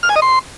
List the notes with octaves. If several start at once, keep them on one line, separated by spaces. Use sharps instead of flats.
F6
G#5
D#5
C6